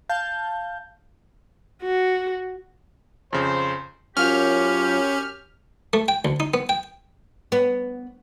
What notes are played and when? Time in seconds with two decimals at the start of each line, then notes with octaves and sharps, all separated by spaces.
0.09 F5 A5 G6
1.82 F#4
3.33 F2 C#3 C5
4.17 F#2 F#3 C#4 F4 G4 F6
5.93 A3
6.08 G5
6.25 D2
6.40 D#4
6.54 B3
6.69 G5
7.52 B3